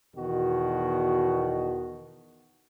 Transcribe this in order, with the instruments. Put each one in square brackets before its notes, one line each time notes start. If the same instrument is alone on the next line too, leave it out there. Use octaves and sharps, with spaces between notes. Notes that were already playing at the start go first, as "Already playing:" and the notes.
[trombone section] E2 B2 D#3 F#4